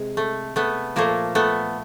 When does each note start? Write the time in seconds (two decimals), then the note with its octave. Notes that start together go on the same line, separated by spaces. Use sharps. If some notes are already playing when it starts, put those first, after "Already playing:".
Already playing: C3 G#3
0.17 A3
0.56 A3 B3
0.96 A#2 F3 A3 A#3
1.35 A3 B3